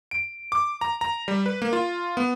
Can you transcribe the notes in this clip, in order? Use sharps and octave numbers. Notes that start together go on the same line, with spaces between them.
D7
D6
A#5
A#5
G3
B4
A#3
F4
B3